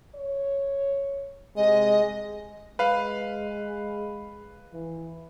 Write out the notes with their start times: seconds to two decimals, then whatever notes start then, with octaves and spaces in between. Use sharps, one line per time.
0.15 C#5
1.57 C3 G#3 D#5
2.79 G#3 B4 F5
4.73 E3